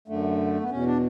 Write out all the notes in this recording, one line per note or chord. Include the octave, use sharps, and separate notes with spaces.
F#2 D3 A3
B3
E2 B2 C#4
D4